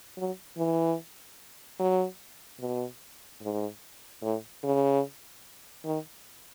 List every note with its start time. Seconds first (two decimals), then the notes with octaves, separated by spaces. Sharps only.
0.17 F#3
0.58 E3
1.80 F#3
2.60 B2
3.41 G#2
4.22 A2
4.64 C#3
5.85 D#3